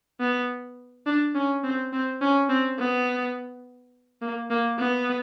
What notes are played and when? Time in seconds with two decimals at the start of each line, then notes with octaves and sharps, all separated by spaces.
0.20 B3
1.06 D4
1.35 C#4
1.64 C4
1.93 C4
2.22 C#4
2.49 C4
2.79 B3
4.22 A#3
4.50 A#3
4.79 B3